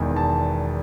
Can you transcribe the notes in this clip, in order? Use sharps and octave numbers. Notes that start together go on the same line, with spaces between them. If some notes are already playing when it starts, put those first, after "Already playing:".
Already playing: E1 E2 D#3
A5